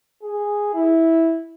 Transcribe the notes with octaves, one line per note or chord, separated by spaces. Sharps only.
G#4
E4